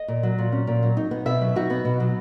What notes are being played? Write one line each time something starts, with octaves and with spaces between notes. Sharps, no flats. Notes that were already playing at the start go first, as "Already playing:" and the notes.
Already playing: D#5
A#2
F#3
A#2
C#4
A#2
F#3
D#4
B3
B2 E5
F#3
D#4 F#4
B3
B2
F#3